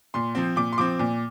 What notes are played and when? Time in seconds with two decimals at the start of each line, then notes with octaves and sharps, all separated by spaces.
0.14 A#2 C6
0.35 F3 C4
0.56 A#2 D6
0.73 C6
0.78 F3 C4 D6
0.99 A#2